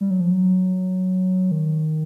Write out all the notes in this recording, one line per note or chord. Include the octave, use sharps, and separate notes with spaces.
G3
F#3
F3
F#3
D#3